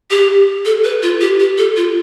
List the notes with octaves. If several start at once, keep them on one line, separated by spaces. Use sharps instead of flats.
G4
A4
B4
F4
G4
G4
A4
F4